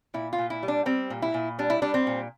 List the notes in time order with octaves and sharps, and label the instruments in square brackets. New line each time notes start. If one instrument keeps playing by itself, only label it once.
[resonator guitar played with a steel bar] A#2 E4
F4
A#2
E4
G3
D4
G3 C4
A#2
E4
A#2
G3 D4
E4
G3 D4
C4
A#2